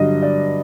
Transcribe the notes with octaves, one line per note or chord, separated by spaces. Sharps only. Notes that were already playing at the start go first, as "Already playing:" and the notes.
Already playing: G2 D3 F#3 D#5
D5